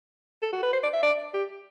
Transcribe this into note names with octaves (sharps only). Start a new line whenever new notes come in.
A4
F#4
B4
C5
D5
E5
D5
G4